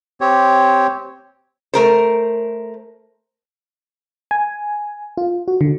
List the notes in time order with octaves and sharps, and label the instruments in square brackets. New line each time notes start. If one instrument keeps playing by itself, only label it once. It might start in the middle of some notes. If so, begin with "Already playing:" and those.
[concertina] C4 G4 C#5
[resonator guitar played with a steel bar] A3 A#4 C5
[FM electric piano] G#5
F4
F#4
D3